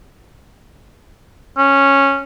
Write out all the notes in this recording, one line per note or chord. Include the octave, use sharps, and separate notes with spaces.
C#4